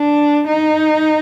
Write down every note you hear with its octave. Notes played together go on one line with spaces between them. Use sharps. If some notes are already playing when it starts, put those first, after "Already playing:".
Already playing: D4
D#4